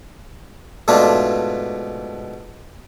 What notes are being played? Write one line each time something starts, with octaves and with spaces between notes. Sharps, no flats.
G#2 B2 A3 D4 F4